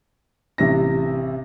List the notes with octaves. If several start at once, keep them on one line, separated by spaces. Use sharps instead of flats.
A1 C3 A#6